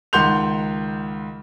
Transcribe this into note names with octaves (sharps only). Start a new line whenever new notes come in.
C#2 D#3 F#5 C6 G6 F7